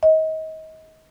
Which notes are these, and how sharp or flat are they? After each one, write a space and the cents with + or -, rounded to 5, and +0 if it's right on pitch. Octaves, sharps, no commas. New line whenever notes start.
D#5 +30